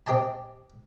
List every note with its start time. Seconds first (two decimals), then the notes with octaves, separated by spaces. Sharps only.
0.07 C4 G4 D#5 G#5 A5